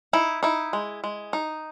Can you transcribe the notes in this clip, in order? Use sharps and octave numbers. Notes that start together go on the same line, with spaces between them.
D#4 E4
D#4 E4
G#3
G#3
D#4